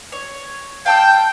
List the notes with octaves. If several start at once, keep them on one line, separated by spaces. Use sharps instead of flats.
C#5
F5 G5 A5 E6